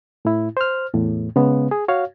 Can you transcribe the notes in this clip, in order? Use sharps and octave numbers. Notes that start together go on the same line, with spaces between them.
A2 E4
C5 F6
E2 A2
C#3 G#3 B3
G#4
F#4 C#5 F5